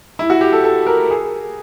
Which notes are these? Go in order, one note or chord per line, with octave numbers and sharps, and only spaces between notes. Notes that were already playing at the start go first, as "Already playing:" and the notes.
E4
F#4
G4
A4
A4
A#4
G#4